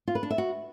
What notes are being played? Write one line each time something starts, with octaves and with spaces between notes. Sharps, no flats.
F4
B4
D4
E5
F#4